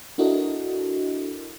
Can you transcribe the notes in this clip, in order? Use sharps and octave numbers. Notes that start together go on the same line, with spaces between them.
D4 E4 F#4 A4 A#4 D#5